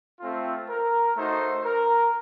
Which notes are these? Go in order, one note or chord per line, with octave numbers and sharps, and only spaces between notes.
A3 C4 F4 A4
A#4
A3 D#4 F#4 C5
A#4